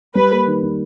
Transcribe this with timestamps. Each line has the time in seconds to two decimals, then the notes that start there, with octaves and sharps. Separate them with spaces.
0.15 G3 B4
0.31 A#3
0.47 D#3
0.62 D#3